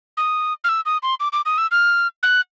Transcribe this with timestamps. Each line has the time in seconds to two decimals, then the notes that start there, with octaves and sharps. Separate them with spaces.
0.17 D#6
0.64 F6
0.69 E6
0.86 D#6
1.03 C6
1.20 D6
1.33 D6
1.46 D#6
1.58 E6
1.71 F6
2.23 F#6